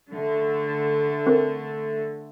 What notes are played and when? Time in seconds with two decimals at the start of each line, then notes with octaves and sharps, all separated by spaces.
0.13 D3 A3
1.26 C4 A#4